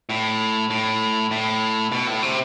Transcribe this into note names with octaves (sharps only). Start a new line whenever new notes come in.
A2
A2
A2
B2
A2
C3